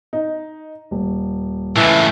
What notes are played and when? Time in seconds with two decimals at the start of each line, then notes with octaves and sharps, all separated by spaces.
0.13 D#4
0.91 D#1
1.76 C#2 A2 E3